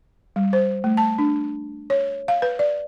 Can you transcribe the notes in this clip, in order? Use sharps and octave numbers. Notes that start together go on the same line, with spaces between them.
G3
C5
A3
A5
D4
C#5
F5
B4
D5